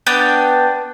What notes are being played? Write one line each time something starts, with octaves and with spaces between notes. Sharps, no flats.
B3 D4 G5